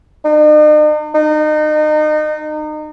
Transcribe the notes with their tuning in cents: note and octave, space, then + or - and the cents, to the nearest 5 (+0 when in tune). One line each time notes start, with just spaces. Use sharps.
D#4 -45
D#4 -30